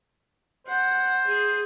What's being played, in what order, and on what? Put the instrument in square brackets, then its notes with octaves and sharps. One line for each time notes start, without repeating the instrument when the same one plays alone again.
[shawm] C5 [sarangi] F#5
[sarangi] G#4